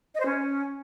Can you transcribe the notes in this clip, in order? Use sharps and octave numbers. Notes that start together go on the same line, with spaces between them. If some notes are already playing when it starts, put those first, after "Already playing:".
D#5
C5
C#4